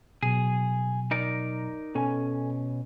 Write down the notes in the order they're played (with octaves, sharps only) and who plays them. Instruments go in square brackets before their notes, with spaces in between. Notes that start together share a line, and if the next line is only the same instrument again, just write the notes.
[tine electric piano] B2 F#3 [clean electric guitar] G#4
[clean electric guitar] D#4 A#4 D5
[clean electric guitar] B2 C#4 [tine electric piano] A4 G#5